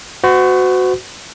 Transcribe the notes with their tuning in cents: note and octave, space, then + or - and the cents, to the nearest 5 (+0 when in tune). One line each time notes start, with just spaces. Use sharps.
F#4 +0 C5 -45